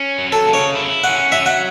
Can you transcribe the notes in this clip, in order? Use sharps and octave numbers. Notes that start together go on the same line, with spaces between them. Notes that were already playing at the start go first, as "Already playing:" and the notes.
Already playing: C#4
F#3
A4
C#3
C#5
E4
C#4 F#5
F#3 E5
F#5